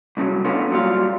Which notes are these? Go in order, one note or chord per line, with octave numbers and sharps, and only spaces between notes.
C2 A2 C#3 E3 F#3
A2 D3 B3 C#4 F4
A#2 F#3 G3 F4